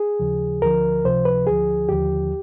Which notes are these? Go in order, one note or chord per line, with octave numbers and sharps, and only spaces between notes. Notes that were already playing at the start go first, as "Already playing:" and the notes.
Already playing: G#4
D#2 C#3 F3
D2 D3 F3 A#4
C#2 C3 F3 C5
B4
D2 D3 F3 G#4
D#2 D3 F3 G4